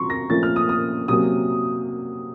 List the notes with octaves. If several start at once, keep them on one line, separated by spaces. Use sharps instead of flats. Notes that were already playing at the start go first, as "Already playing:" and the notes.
Already playing: C3 D#3 F#3 C4 F4 A#5 C6 C#6
A#6
A#2 F3 A3 C#4 F4 A6
F6
D#6
D#6
C3 F#3 A#3 C#4 D#6